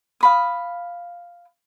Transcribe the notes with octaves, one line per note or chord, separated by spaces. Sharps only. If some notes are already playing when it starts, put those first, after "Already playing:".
F5 B5 D#6